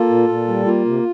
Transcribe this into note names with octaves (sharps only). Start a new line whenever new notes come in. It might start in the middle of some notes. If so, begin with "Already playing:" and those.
Already playing: A#3 F4 A4
A#2
A#2
G3
A#3 F4
C3